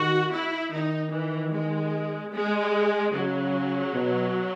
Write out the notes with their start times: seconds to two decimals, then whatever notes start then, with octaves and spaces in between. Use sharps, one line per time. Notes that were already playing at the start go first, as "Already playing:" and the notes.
Already playing: D#3 F#4
0.31 E4
0.72 D#3 D#4
1.11 E3
1.51 G#3
2.32 G#3
3.13 C#3 F#3
3.93 B2